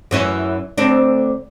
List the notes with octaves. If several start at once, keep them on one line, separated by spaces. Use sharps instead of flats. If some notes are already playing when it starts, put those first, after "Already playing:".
F#2 E3 C#4
D2 C4 D4